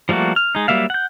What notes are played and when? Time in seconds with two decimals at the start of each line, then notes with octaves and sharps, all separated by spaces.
0.09 F3 G3 A3 A#3 F#4
0.36 F6
0.55 G#3 D#4
0.68 F#3 G3 A#3 E5 F5
0.90 F#5 G6